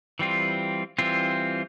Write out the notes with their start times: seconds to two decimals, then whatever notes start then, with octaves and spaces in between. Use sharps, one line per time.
0.19 E3 G3 C4 F4
0.98 E3 G3 C4 F4